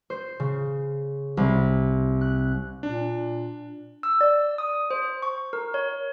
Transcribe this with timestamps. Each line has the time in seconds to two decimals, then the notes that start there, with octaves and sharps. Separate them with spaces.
0.10 C5
0.40 C#3
1.37 C2
2.21 F#6
2.83 A#2 D4
4.03 E6
4.21 D5
4.58 D#6
4.91 C5
5.22 C#6
5.53 A#4
5.74 C#5